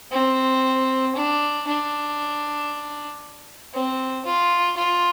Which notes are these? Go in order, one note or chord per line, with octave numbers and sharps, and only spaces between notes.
C4
D4
D4
C4
F4
F4